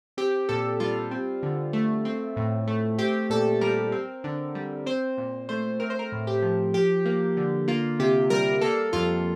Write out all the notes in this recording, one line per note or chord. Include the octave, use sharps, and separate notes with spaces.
C4 G4
A#2 A4
G3 F4
C4
D3
A3
C4
A2
A3
C4 G4
A#2 A4
G3 A#4
C4
D3
G3
C4 C5
A#2
A3 C5
C4 A#4
C5
A#4
A2
G4
F3
F3 G4
A#3
D3
A#3 F4
C3 G4
G3 A#4
A#3 A4
F2 F4